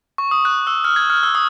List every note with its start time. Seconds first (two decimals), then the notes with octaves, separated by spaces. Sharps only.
0.18 C#6
0.31 D#6
0.45 F#6
0.67 E6
0.84 F6
0.96 G#6
1.10 F6
1.23 E6
1.35 D#6